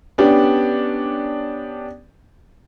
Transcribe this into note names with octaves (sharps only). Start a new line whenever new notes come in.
B3 C#4 D4 G4